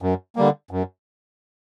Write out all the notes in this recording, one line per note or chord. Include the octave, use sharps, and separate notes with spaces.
F#2
D3 G3 A#3
F#2